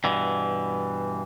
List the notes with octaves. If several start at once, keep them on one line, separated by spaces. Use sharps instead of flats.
G2 B2 E3